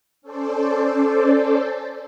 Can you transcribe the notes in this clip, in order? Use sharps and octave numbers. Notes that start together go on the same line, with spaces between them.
C#4 A4 C5 D5